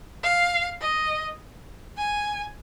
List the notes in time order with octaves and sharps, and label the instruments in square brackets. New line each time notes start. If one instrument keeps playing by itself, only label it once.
[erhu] F5
D#5
G#5